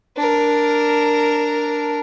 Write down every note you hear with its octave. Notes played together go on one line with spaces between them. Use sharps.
D4 A#4